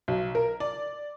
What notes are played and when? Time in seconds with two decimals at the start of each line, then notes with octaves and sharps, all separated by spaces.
0.08 B1
0.35 A#4
0.60 D5